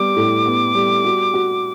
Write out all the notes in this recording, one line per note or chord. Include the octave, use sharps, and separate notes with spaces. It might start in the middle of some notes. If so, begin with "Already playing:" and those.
Already playing: G3 B3 D6
A2
B3
G3
F#4
F#4